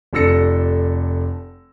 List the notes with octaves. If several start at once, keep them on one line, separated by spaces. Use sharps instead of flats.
F1 D4 A4 E6 A#6 C#7